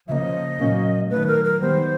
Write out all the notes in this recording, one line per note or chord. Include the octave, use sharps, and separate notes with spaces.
C#3 F3 A#3 D#5 E5
A#2 F#3 A#3 C#4
D#3 F#3 A3 B4
A#4
A#4
D#3 G3 B3 C5